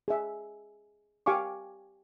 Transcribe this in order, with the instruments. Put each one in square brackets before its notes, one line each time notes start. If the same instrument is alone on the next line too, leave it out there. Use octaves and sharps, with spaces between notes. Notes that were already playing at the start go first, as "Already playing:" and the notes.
[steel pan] G#4 E5
G4 F5 G#5 C#6 D6